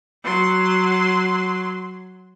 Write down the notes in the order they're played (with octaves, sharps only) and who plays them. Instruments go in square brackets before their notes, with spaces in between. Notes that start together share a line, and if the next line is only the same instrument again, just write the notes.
[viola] F#3 C6